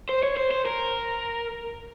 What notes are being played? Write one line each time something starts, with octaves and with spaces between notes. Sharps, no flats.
C5
C#5
C5
C5
A#4